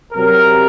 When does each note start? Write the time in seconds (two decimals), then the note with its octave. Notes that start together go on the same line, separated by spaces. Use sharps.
0.13 C3 F#3 C4 A#4